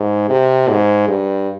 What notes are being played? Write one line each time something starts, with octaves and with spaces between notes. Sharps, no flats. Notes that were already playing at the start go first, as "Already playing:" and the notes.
Already playing: G#2
C3
G#2
G2